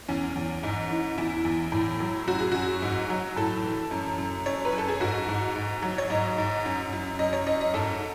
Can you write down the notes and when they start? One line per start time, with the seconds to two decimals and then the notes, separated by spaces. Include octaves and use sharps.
0.08 E2 C#4
0.36 E2
0.63 G#2
0.90 E3
1.18 E2 E4
1.45 E2
1.72 A2
2.00 F#3
2.27 F#2 F#4
2.40 G#4
2.52 F#2 F#4
2.82 G#2
3.10 F#3
3.36 A2 A4
3.63 E3
3.91 F#2
4.18 F#2
4.46 F#2 C#5
4.65 B4
4.73 F#2
4.78 A4
4.88 G#4
5.00 G#2 F#4
5.29 G#2
5.56 G#2
5.82 F#3
5.98 C#5
6.10 G#2 D#5
6.38 G#2
6.65 F#2
6.93 F#2
7.19 F#2 D#5
7.33 C#5
7.46 F#2 D#5
7.61 D#5
7.74 G#2 A4